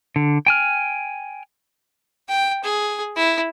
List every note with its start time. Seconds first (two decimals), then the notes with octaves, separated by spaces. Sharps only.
0.16 D3
0.46 G5 G#5 F6
2.28 G5
2.64 G#4
3.16 E4